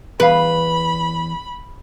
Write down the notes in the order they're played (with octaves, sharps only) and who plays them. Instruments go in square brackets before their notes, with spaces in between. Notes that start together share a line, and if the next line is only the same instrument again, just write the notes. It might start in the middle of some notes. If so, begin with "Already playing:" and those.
[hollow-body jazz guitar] E2 F5 [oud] B4 [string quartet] B5